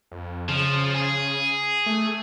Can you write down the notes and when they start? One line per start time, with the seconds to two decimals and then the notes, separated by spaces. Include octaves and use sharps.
0.12 F2
0.48 C#3 F3
0.94 G#4
1.86 A3